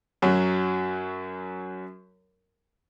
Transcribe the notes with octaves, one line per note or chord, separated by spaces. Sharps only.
F#2 F#3